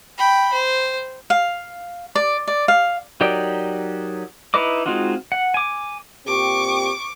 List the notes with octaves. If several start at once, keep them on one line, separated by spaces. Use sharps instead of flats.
G5 B5
C5
F5
D5
D5
F5
F#3 D#4 G4 A#4 D5
D#4 E4 B4 D#5 D6
G#3 C4 D#4 F4 F#4
F#5
G#5 D6
A#2 C4 G4 C#6 D6